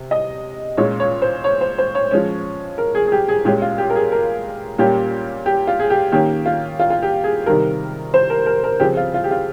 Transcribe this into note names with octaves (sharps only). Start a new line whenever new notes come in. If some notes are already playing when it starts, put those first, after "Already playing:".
Already playing: C3
D#5
A#2 G#3 C#4 C#5
C#5
C5
C#5
C5
C5
C#5
F3 G#3 C#4
A#4
G#4
G#4
G4
G#4
A#2 G#3 C#4 G4
F4
G4
A#4
G#4
A#4
A#2 G3 A#3 C#4 G4
G4
F4
G#4
G4
D#3 A#3 C#4 G4
F4
F4
F4
G4
G#4
C3 D#3 G3 A#4
C5
A#4
A#4
A#4
C#3 F3 C4 G4
F4
F4
G4
F4